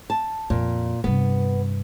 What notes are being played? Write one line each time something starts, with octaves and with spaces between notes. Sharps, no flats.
A5
F2 A#2
G2 C3 B3